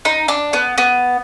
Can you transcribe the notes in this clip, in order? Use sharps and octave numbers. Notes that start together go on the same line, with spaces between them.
D#4
D4
B3
B3